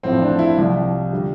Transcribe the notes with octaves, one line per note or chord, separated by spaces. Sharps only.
A1 A2 F3 C4
D4
E4
C2 C3 F3
D3 G3